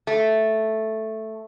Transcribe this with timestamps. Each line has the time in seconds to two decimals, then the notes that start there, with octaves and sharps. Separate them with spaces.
0.07 A3